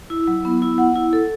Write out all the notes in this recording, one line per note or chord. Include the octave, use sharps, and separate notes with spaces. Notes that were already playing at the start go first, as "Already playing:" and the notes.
E4
F#3
B3
E4
F#5
E4
A4